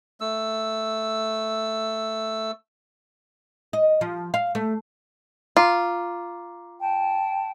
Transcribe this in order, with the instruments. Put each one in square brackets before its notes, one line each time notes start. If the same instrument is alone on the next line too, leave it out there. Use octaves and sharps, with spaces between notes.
[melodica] A3 E6
[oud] D#5
F3
F5
A3
[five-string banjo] F4 [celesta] A#5 D6
[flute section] G5 A5